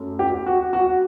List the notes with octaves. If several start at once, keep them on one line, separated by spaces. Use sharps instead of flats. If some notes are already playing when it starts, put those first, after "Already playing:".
Already playing: F#2 A3
G4
F#4
F#4